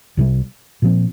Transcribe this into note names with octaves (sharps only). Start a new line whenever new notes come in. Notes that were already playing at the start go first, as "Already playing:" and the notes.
C2 C3 G3
A#2 F3 C4